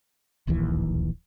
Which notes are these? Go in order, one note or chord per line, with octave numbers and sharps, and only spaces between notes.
D1 A#1 D#2 E3